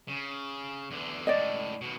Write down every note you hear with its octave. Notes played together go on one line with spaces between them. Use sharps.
C#3
E2 D3
C#2 A2 D5 D#5
D#2 B2